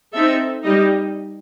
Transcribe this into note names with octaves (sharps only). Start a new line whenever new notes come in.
C4 D#4 A4 E5
G3 D#4 G4 D#5